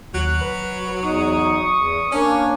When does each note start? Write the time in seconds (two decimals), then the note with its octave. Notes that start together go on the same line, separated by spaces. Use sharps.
0.14 D#2 F#3 F#6
0.41 B4
1.03 E2 D#4 C#6 D#6
1.76 E2
2.12 A#3 C#4 D4 C#5 G#5